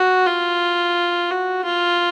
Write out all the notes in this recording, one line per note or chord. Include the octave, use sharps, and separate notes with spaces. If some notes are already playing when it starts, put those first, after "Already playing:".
Already playing: F#4
F4
F#4
F4